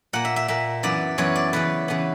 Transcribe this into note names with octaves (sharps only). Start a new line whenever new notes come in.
A#2 A#3 F#5
E5
E5
A#2 A#3 E5
F#2 E3 B3 D5
F#2 E3 B3 C#5
D5
C#3 E3 B3 B4
C#3 E3 B3